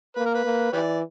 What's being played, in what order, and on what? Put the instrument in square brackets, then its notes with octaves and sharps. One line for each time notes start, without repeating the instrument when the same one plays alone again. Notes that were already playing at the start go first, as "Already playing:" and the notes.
[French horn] A#3 [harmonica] B4
[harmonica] A#4
B4
[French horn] A#3
[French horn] E3 [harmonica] G4 B4 D5